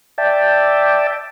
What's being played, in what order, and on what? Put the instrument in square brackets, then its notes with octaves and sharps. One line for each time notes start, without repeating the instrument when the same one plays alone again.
[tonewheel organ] D5 E5 G5 A5